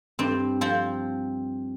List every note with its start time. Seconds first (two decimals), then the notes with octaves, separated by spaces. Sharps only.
0.19 G2 C4
0.61 F3 C4